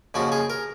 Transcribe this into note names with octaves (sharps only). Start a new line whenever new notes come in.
D#2 C#3 F3 F#4
G#4
A#4